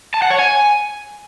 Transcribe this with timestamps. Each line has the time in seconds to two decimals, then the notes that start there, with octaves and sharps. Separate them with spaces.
0.14 A5
0.22 F#5
0.30 C#5
0.39 G#5